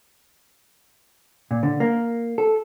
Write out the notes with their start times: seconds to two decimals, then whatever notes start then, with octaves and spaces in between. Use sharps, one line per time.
1.51 A#2
1.63 D3
1.80 A#3
2.38 A4